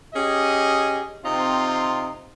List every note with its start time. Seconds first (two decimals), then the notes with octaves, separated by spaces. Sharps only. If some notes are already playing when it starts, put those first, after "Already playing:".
0.14 C#4 G4 G#4 D#5
1.24 C3 C4 D#4 F4